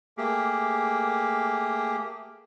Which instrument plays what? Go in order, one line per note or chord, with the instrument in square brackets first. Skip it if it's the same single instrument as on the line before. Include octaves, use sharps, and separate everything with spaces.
[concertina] A3 A#3 G4 G#4